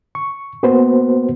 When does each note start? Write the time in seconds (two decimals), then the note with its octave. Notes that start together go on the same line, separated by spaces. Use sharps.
0.15 C#6
0.63 A#3 B3 F#4 B4 C5